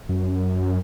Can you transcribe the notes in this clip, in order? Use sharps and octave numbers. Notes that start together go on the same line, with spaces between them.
F#2